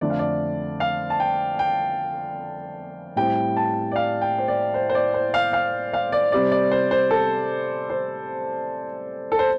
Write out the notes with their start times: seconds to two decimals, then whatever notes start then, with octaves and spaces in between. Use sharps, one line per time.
0.01 F2 D3 A3 D4 D5
0.10 F5
0.19 D5
0.80 F5
1.10 A5
1.20 G5
1.59 G5
3.16 A2 G3 C4 G5
3.57 A5
3.91 D5
3.96 F5
4.21 G5
4.38 C5
4.48 D5
4.74 C5
4.90 C5
4.95 D5
5.14 C5
5.34 F5
5.53 F5
5.93 F5
6.12 D5
6.32 C3 G3 C4 D5
6.51 D5
6.72 C5
6.91 C5
7.11 A4
7.90 C5
9.32 A4
9.39 C5